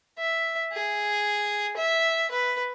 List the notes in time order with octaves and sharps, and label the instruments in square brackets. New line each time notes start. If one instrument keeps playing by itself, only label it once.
[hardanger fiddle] E5
G#4
E5
B4